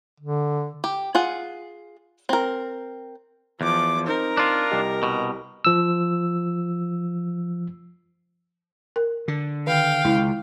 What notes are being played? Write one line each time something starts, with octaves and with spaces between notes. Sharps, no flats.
D3
G4
F4 G#4 F#5
C4 A#4
E2 F3 D6
C4 D#4 A#4 C5
D4 F4
C2 G4 D#5
B2
F3 E6
A#4
D3
D#3 F5 G5
C#2 E4